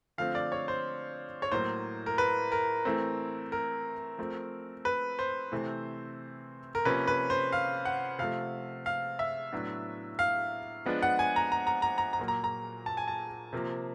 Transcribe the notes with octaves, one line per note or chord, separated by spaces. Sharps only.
D3 F3 A3 C4 F5
D5
C#5
C5
C#5
A2 F#3 A#3 C5
A#4
B4
A#4
E3 A3 C4
A#4
F3 A3 C4
B4
C5
C3 E3 A3 C4
A#4
C3 F3 A#3 C#4 B4
B4
C5
F5
F#5
C3 F3 A3 F5
F5
E5
A2 F#3 B3 D4
F5
F3 G#3 B3 D4
F#5
G#5
A#5
A#5
A#5
A#5
A#5
A#5
A#2 F#3 A#3
A#5
A#5
A5
G#5
A5
C3 F3 A#3